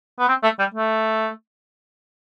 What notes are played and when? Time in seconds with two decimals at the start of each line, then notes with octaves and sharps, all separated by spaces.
0.19 B3
0.28 C4
0.43 A3
0.59 G3
0.74 A3